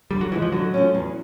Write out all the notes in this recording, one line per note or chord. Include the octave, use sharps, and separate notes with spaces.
D3 G3
F#3
E3 F3 G#3
F3
D3 F#3
F3 A3 C#4
E2